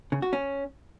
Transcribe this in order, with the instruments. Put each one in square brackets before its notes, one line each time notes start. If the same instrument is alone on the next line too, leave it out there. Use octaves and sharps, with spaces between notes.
[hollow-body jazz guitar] C#3
F#4
C#4